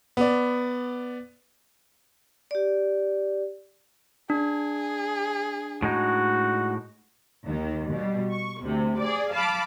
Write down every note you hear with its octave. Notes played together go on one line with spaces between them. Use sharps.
B3 D5
G4 D5
D4 G#4
A2 G#3 D#4 F#4
D#2 D#3
B2 G3
C#6
D2 C3
G#4 D5
F5 A5 B5 D6